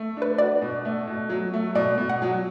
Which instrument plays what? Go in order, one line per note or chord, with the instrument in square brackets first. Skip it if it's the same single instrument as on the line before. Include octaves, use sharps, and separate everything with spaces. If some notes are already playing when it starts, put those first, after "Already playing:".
Already playing: [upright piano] A3
[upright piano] D4 [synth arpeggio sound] B4
[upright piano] F#4 [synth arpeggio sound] D5
[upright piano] B2
A3
B2
F#3
A3
[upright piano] B2 [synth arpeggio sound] D5
[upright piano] B2
[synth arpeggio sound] F#5
[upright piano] F#3